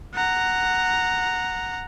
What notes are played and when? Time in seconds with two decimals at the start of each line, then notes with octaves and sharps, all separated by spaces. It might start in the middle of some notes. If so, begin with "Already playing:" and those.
0.15 F#5 A#5